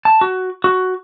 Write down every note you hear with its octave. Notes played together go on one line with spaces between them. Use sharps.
A5
F#4
F#4